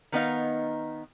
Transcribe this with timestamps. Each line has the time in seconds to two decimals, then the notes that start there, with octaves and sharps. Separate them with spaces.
0.12 D#3 B3 D#4 F5